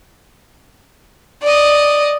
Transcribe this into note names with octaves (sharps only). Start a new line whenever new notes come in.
D5 D#5